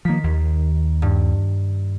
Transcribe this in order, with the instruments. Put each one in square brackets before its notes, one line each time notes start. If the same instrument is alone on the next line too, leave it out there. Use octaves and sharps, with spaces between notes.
[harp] D#3 B6 [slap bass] F3 A#3
[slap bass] D#2
[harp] G2